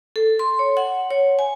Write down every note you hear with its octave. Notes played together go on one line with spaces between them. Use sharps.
A4
C6
C#5
F#5
C#5
G#5